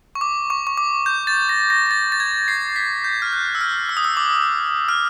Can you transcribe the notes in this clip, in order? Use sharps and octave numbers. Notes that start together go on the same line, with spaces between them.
C#6
D6
C#6
C#6
D6
G6
A6
A#6
A#6
A#6
A6
A6
G#6
C7
B6
G6
F6
F#6
E6
F6
E6
D#6
E6
D6
F6